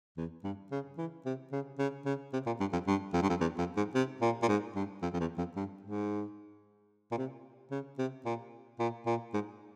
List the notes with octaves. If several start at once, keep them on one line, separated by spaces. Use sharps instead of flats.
E2
G2
C#3
E3
C3
C#3
C#3
C#3
C3
A#2
G2
F2
G2
F2
G2
F2
E2
F2
G#2
C3
A#2
A#2
G#2
G2
F2
F2
E2
F2
G2
G#2
A#2
C3
C#3
C3
A#2
A#2
A#2
G#2